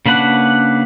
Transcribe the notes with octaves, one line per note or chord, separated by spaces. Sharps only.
C#3 A#3 D4 B4 F#5